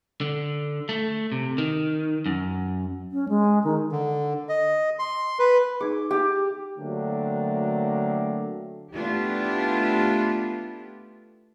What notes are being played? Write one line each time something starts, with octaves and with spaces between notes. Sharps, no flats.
D3
A3
C3
D#3
F#2
C#4
G#3
D#3
D3
D#5
C6
B4
D#4 G#4 D6
G4
D3 F#3 A3 A#3 C4 D4
A3 B3 D4 E4 F4 G4